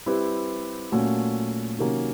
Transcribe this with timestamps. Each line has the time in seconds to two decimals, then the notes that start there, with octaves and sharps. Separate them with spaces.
0.06 G3 C4 E4 G4 B4
0.92 A#2 F#3 A3 C#4 F#4
1.78 C3 D#3 F#3 A#3 C#4